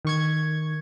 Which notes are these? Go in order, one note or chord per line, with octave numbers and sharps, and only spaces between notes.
D#3 C#6 G#6